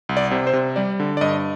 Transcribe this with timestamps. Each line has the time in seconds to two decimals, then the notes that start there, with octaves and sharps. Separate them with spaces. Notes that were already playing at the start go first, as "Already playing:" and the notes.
0.09 C2
0.17 D5
0.31 C3
0.47 C5
0.53 C3
0.76 G3 D5
1.00 D3
1.17 D5
1.21 G2 D#5